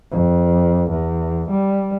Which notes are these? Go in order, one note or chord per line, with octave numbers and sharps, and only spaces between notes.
F2
E2
G3